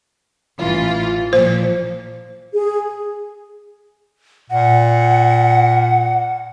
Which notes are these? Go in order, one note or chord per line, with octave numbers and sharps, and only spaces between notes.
A1 E3 F4
A#2 F3 C5
G#4
A#2 F#5